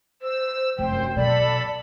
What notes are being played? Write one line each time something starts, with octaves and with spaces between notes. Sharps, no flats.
C5 E6
F1 F#2 C5 G5
B2 F#3 A4 D5 B5